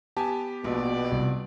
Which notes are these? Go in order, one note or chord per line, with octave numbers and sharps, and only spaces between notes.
B3 G4 G#5 A5
A#1 B2 D5
C2